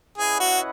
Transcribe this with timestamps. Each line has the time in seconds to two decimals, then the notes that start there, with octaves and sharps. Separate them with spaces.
0.17 C#4 E4 G#4 B4 D#5 F#5
0.40 F#4